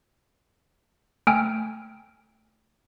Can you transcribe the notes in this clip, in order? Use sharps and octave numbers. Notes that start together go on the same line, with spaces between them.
A3 G5 G#5 E6 F6 D7